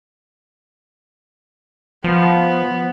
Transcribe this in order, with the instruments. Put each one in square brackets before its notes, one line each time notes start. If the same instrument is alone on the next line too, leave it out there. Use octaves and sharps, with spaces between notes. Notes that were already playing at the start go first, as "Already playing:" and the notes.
[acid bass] F3 [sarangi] B3